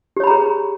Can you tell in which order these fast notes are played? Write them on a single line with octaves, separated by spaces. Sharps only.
G4 C#5 B5 A#5 G#4